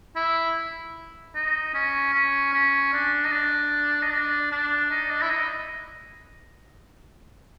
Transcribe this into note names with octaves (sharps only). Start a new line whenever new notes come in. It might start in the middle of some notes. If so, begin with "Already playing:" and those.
E4
D#4
C#4
C#4
C#4
D4
D#4
D4
D#4
D4
D4
D#4
D4
E4
D#4